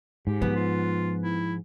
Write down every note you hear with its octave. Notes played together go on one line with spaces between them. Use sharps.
G#2 G4
F3 B3
F4
E4